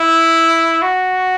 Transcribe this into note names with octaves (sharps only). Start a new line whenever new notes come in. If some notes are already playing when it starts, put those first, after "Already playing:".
Already playing: E4
F#4